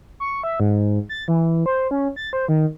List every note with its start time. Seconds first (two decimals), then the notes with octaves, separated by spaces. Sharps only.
0.20 C#6
0.44 E5
0.60 G#2
1.09 A6
1.28 E3
1.66 C5
1.91 C#4
2.16 A6
2.33 C5
2.48 D#3